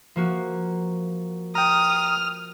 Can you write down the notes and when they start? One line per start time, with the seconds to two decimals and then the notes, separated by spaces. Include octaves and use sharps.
0.16 F3 A#3 F#4
1.55 G5 A#5 D#6 F6